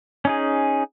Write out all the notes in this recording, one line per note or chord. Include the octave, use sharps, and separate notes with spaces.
C#4 D#4 G#4